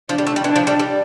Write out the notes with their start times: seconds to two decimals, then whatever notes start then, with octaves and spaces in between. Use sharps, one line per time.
0.09 F3 D4
0.18 G3
0.27 A3
0.36 G3
0.44 E3 D4
0.56 F3
0.67 G3
0.79 G3